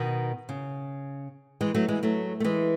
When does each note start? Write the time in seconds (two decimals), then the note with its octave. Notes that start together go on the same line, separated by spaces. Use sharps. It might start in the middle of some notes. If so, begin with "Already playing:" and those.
Already playing: B2 D#3
0.49 C#3
1.61 E3 G#3
1.75 F#3 A3
1.88 E3 G#3
2.03 F#3 A3
2.40 A3
2.44 E3 G#3